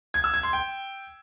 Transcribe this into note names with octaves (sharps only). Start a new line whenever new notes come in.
G#6
E6
G#6
C6
G5